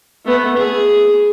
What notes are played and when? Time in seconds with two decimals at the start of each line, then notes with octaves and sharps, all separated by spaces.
0.25 A3 B3
0.57 G#4